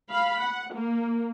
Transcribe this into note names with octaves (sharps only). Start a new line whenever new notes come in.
F5 B5
F#5
A#3